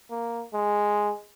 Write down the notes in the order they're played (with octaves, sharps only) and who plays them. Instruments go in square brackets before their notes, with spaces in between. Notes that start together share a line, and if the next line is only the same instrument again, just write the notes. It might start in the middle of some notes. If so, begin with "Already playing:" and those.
[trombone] A#3
G#3